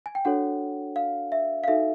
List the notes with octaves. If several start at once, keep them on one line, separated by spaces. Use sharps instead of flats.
G#5
G5
D4 F#4 A4 C#5 F#5
F5
E5
F5
D#4 F#4 A4 E5